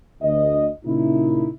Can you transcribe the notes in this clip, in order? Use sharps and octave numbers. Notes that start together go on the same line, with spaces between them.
D2 D#5
A#2 C#3 D#4 E4